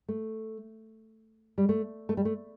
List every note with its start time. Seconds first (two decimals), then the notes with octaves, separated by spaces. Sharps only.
0.08 A3
1.58 G3
1.69 A3
2.09 A3
2.17 G3
2.25 A3